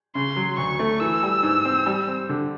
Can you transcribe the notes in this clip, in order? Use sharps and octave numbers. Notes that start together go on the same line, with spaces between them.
C#3 C6
F#3
D2 C#6
A3
E3 E6
G3
G#2
C4
G3
C4
D3